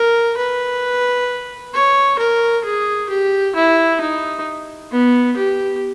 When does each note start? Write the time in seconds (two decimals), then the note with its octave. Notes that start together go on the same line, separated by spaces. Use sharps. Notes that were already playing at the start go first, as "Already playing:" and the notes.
Already playing: A#4
0.37 B4
1.73 C#5
2.19 A#4
2.64 G#4
3.09 G4
3.55 E4
4.00 D#4
4.92 B3
5.37 G4